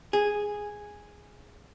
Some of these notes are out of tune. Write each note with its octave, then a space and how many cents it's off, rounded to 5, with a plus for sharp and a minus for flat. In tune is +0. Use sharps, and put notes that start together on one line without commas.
G#4 -5